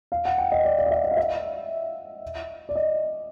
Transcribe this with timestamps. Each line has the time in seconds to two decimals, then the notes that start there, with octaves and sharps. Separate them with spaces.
0.12 F5
0.25 F#5
0.38 G5
0.52 D#5
0.65 D5
0.78 D5
0.86 D#5
0.91 E5
1.04 D#5
1.11 F5
1.17 E5
2.69 D5
2.75 D#5